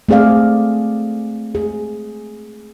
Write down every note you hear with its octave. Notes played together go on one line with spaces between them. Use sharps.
A3 C4 G#4 D5 F5
G#4